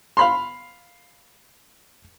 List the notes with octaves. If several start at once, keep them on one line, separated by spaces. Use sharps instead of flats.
F5 B5 C6